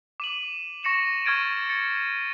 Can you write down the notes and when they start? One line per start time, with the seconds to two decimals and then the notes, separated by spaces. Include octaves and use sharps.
0.20 D6 D#7 F#7
0.83 C#6 A#6 C#7 E7 F#7
1.25 C#6 F6 G#6 A6 D7 D#7
1.69 A6 C#7